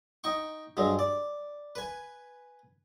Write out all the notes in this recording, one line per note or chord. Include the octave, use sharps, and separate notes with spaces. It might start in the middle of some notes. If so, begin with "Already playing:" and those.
D#4 G5 C#6
G2 F#3 G#3
D5
B4 G#5